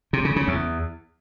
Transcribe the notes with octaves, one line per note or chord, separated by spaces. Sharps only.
C3
C#3
C#3
E2